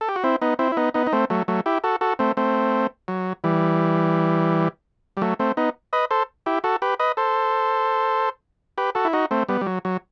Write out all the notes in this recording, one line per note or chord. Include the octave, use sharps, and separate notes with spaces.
A4
G4
F#4
C4 E4
B3 D#4
C4 E4
E4
B3 D#4
B3 D#4
D#4
A3 C4
F#3 A3
F#3 A3
E4 G4
F#4 A4
F#4 A4
A3 C4
A3 C4
F#3
E3 G3
G3
F#3 A3
A3 C4
B3 D#4
B4 D#5
A4 C5
E4 G4
F#4 A4
G4 B4
B4 D#5
A4 C5
G4 B4
F#4 A4
E4
D#4 F#4
A3 C4
G3 B3
G3
F#3
F#3